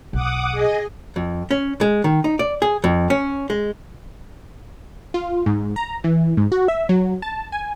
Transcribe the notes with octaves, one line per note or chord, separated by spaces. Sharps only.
B1 F#5 D6 D#6
G#4 D#5
F2
C#4
G#3
D#3
D#4
D5
G#4
F2
C#4
G#3
F4
G#2
A#5
E3
G#2
F#4
E5
F#3
A5
G#5